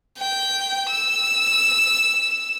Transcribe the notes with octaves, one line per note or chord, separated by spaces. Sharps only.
G5
E6